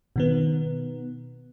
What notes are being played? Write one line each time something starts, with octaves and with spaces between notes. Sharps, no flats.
B2 D#3 B3